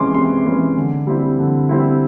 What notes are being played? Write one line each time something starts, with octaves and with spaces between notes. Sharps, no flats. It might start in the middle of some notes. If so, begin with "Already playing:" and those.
Already playing: C3 E3 G#3 C#4 C6 D6
C3 C6
E3 G#3 C#4
D3
G3 C4 E4
D3
G3 C4 E4